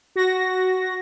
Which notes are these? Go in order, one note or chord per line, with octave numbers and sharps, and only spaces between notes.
F#4 A#6